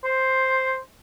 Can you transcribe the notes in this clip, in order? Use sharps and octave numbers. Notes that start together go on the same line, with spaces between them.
C5